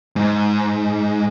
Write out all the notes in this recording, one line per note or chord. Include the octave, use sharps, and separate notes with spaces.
G#2